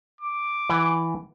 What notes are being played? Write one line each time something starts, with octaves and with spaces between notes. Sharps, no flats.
D6
E3 F#5 G#5